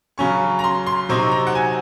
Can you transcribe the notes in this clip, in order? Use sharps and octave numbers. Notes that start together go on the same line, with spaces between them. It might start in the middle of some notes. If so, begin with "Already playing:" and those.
C#3 F#3 C#4 C#6
A#5
C6
C6
C3 F#3 C4 D#4 C#6
A#5
F#5
G#5